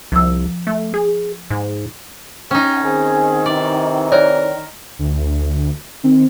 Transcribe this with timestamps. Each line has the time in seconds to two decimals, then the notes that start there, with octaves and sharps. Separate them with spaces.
0.12 C2 F3 E6
0.67 A3
0.94 G#4
1.50 G#2
2.51 C#4 D#4 G5
2.83 D#3 C4 G#4
3.46 C3 E3 D#4 D5
4.12 A#4 C#5 D5
4.99 D2
6.04 D#3 C4